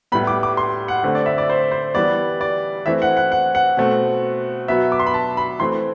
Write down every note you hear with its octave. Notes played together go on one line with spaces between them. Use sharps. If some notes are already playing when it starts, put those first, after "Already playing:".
A2 G3 B3 B5
D6
D6
C6
F#5
D3 A3 C4
D5
E5
D5
C5
C5
E3 G3 B3 D5
D5
E3 A3 C4 E5
F#5
F#5
F#5
F#5
B2 A3 C4
B2 F#3 B3 E5
D6
C6
B5
A5
B5
E3 A3 C4 C6